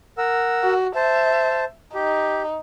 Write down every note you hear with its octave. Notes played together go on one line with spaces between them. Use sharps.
A#4 F#5 E6
F#4
C5 E5 A5
D#4 G4